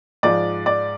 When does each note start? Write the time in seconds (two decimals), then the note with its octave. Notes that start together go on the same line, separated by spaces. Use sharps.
0.23 G#2 F3 G#3 D5
0.66 D5